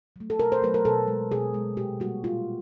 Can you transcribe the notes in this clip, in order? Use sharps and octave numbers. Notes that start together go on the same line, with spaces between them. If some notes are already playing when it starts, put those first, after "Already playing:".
F#3 A3
A4
B2 A#4
C5
F#3 A3 B4
A#4
B2 A4
G#3
B2 G#4
G#3
A#2 G4
G3 A#3 F#4
A#2 F4